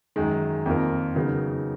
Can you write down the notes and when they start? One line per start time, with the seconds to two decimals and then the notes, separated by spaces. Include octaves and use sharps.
0.16 F#2 D#3 G#3
0.66 F2 D#3 A#3 F4 A#4
1.15 C#3 F#3 B3 D#4 A#4